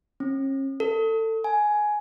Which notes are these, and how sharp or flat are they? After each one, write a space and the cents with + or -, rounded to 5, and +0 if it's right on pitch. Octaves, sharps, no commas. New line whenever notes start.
C#4 -40
A4 +25
G#5 +10